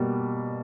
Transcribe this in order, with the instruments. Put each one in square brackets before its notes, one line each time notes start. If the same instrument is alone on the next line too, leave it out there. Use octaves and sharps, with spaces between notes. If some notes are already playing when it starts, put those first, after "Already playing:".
Already playing: [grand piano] B2 G3 A#3